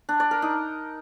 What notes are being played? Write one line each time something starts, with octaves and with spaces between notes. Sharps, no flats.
D4
D5
A#4
D#4